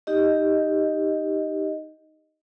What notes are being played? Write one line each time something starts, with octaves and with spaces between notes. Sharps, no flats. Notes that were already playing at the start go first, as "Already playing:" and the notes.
D#4 G4 D#5